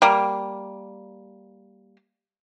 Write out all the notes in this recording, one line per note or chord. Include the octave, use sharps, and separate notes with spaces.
G3 A#3